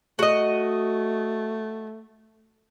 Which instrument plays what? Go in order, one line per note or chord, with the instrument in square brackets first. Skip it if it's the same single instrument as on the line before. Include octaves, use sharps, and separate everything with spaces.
[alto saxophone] A3 [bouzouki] F#4 D#5